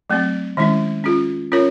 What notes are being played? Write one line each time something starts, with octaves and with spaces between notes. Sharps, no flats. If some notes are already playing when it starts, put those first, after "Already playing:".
F#3 A3 C4
D#3 G#3 C#4 E4
C#4 F4 G#4
C#4 F4 A#4 C#5